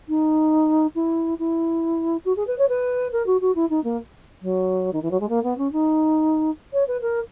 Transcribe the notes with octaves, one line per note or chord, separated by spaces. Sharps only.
D#4
E4
E4
F#4
G#4
B4
C#5
B4
A#4
F#4
F#4
E4
D#4
A#3
F#3
D#3
E3
F#3
G#3
A#3
B3
C#4
D#4
C#5
B4
A#4